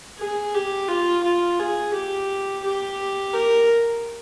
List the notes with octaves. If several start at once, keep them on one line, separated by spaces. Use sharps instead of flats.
G#4
G4
F4
F4
G#4
G4
G4
A#4